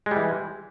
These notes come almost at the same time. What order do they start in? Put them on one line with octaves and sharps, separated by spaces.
G#3 G3 E3